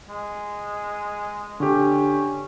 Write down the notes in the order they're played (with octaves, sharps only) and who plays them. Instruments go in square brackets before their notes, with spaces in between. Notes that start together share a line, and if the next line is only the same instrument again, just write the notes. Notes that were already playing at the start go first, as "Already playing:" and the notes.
[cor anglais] G#3
[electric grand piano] D3 G4 [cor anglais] C#4